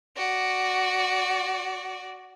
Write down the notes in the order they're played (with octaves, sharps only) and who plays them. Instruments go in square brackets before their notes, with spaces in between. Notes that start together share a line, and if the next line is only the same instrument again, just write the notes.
[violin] F#4 D5